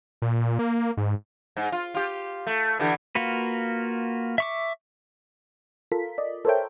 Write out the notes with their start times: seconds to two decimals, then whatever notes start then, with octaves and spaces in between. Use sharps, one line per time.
0.22 A#2
0.59 A#3
0.97 G#2
1.57 G#2
1.72 F4
1.95 F4 G4
2.47 A3
2.79 D3 E3 G4
3.15 A#3 F4 F#4 B4
4.38 E5 C#6 D6
5.92 F4 A4 A#4 B6
6.18 D5 D#5
6.45 A4 A#4 C5 C#5 E5 G5